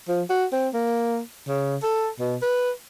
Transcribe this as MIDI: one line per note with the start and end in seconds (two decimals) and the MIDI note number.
0.08 0.22 53
0.30 0.45 66
0.52 0.68 60
0.74 1.19 58
1.48 1.76 49
1.83 2.08 69
2.19 2.37 47
2.42 2.70 71